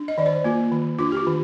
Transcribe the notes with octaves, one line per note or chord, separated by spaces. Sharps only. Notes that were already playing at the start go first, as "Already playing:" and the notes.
Already playing: D4
D#5
D#3 D5
C5
A#3 F4
D#3
D4 F4
G4
F4
D#3